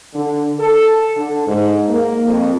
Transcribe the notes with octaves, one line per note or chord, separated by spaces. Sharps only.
D3
A4
D3
G#2
A#3
F2